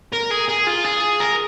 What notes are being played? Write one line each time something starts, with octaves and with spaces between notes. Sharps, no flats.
A#4
G#4
G#4
F4
G#4
A#4